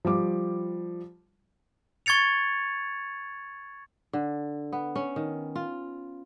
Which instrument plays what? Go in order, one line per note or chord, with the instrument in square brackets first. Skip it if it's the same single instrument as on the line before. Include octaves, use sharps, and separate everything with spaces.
[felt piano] F3 G3 D6
[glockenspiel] C#6 G#6 A6 C#7 F7
[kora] D3
B3
C#4
D#3
F4